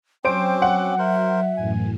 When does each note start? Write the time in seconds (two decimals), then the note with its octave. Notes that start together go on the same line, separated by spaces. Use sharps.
0.25 F#3 C4 C#4 C5 G5 D6 D7
0.62 F#5
0.99 A#4 C5 E5
1.57 F#2 A2 E3 G#5